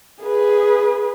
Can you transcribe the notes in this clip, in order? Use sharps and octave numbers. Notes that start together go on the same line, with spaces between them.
G#4 B4